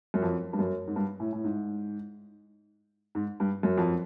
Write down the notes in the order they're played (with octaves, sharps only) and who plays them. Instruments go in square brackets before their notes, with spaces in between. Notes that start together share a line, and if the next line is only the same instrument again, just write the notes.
[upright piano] F#2
F2
G2
F#2
G#2
G2
A2
A2
G#2
G#2
G2
F#2
F2